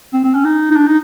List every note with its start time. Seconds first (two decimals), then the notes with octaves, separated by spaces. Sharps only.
0.14 C4
0.24 C4
0.34 C#4
0.44 D#4
0.71 D#4
0.76 D4
0.87 D#4